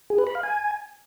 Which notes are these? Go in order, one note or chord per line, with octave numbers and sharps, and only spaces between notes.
G#4
B4
B5
F5
G#5